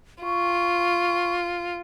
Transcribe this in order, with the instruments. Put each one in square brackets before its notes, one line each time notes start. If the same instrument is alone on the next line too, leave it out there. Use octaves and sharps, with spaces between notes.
[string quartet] F4 [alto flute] C#6